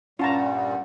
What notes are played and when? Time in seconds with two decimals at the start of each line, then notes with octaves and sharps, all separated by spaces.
0.19 G2 A#2 G3 C#4 F4 F#5 A5 A#5